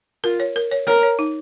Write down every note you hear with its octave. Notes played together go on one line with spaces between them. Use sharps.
F4 A#4
C#5
A#4
C#5
A#4 C#5
C#5
D#4